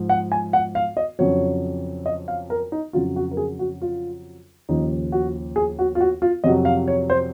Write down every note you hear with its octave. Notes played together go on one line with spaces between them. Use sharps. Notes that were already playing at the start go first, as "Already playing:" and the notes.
Already playing: G#2 F3
F#5
G#5
F#5
F5
D#5
F2 C#3 F#3 C#5
D#5
F5
A#4
D#4
F2 C#3 F#3 F4
F#4
A#4
G#4
F#4
F4
D#2 C#3 F3 D#4
F#4
G#4
F#4
F4
F#4
F4
F2 C3 F#3 D#5
F5
C#5
C5